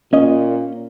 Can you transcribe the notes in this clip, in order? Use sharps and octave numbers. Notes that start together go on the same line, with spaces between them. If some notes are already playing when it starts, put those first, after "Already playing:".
A#2 C#4 D#5